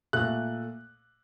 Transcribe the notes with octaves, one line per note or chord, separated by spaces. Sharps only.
A#2 A3 F#6